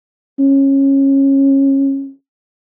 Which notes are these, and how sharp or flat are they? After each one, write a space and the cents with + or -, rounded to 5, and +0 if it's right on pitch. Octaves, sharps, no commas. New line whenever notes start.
C#4 -20